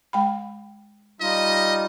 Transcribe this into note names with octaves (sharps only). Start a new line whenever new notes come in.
G#3 G5 B5
G3 D#4 F4 D#5